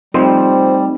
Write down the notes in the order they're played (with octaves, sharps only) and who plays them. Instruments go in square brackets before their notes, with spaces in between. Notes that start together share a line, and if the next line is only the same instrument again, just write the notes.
[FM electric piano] F3 C5 [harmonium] G3 [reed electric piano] A3 C4 D#4